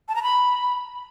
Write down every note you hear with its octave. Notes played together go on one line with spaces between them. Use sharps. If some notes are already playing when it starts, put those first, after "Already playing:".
A5
A#5
B5